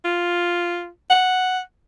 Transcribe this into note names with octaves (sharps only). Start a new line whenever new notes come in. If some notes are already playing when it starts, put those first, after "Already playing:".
F4
F#5